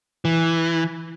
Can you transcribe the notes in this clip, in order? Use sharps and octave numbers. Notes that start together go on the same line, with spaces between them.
E3